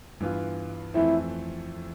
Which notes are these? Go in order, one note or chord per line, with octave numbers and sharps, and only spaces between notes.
G2 E3 B3 F4
F2 E3 A3 C4 E4